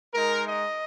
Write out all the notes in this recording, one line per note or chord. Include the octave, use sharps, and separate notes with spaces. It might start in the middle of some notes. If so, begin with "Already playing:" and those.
G#3 D#4 A#4
D#5